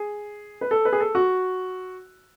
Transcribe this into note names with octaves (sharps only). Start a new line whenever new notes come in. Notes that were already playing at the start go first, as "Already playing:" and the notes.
Already playing: G#4
B4
A4
B4
G#4
A4
F#4